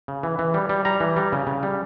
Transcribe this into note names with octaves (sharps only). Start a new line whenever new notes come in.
C#3
E3
E3
G3
G3
G3 A#5
E3
G3
C#3
C#3
G3